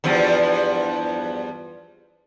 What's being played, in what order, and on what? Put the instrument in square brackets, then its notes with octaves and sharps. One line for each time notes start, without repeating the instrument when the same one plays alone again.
[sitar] E2 G2 F3